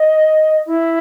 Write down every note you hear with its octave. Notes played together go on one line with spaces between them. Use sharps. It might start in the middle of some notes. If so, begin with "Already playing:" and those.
Already playing: D#5
E4